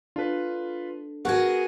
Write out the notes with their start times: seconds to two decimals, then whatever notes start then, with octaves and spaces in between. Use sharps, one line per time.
0.16 D4 F4 A4 B4
1.25 B3 F#4 G#4 A#4 G#5 G#6